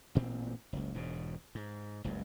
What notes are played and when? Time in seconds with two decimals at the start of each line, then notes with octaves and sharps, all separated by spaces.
0.15 A1 A#2 C4
0.73 F#1 C#2
0.94 E1 G#2 B2
1.55 G#2
2.04 F#1 C#2 G2